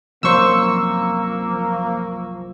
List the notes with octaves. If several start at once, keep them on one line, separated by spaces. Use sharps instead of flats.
C2 F#2 F3 A#3 C5 C#6 E6